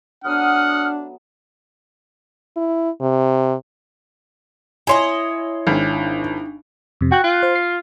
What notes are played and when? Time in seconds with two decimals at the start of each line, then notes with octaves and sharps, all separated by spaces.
0.24 F#3 A3 B3 D4 F#5 D#6 F6
2.57 E4
3.01 C3
4.87 E4 C#5 D#5 G#5 C6
5.67 G#1 D4 D#4
7.01 F2 C3
7.12 F#4 G5 F#6
7.24 F4
7.43 C5
7.55 C7